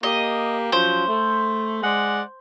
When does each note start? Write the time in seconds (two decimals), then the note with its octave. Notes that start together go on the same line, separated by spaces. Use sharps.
0.03 A#3 G4 D#5
0.72 F3 F#3 C#4 C5
1.07 A3
1.83 G#3 D5 F#5